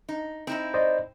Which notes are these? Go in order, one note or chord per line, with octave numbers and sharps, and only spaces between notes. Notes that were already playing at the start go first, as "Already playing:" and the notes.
D#4
C4 D#4 E4
C5 D5 D#5